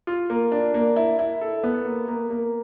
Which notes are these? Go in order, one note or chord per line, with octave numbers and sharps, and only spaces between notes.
F4
A#3
D4
A#3
E4
E4
A4
B3
A#3
A#3
A#3